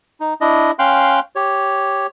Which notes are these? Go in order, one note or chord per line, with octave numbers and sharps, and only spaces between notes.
D#4
D4 E4 D#5
C#4 F5 G5 C6 F#6
G4 C#5